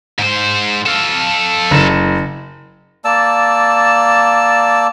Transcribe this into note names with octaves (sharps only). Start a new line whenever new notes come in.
G#2 C5
A4 F5
F#1
A#3 D5 A5 E6